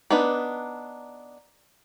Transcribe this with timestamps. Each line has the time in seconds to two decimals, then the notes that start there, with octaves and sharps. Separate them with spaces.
0.10 B3 D4 D#4 B4